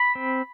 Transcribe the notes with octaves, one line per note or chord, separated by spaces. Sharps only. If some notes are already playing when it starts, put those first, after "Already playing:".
Already playing: B5
C4